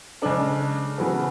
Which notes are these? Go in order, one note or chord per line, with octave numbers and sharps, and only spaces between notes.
C#3 G#3 D4 A4
C#3 E3 B3 F#4 A4